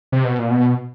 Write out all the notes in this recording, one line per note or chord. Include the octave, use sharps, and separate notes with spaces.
C3
B2
A#2
B2